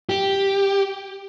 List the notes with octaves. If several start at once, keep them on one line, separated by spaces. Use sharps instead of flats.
G4